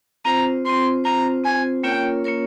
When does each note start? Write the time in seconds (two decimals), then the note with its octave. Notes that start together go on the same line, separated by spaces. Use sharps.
0.25 C4 F4 C5 A#5
0.65 C4 F4 C5 C6
1.04 C4 F4 C5 A#5
1.44 C4 F4 C5 G#5
1.84 A#3 C#4 F4 A#4 C#5 G5
2.24 A#3 C#4 F4 A#4 C#5